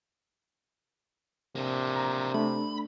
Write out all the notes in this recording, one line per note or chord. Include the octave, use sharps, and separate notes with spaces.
C3 A#3 D4
A#5
A3 D4 B5